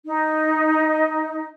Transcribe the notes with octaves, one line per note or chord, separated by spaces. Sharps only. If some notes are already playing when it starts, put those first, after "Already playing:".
D#4